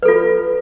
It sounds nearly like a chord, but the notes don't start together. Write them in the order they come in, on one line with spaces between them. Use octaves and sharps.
B4 A4 F4